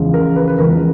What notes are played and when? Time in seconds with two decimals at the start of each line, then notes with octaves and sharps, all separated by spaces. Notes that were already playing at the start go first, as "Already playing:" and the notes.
Already playing: E2 C#3 F3 G#3
0.14 A#4
0.36 B4
0.48 B4
0.59 E2 C#3 F3 G#3 A#4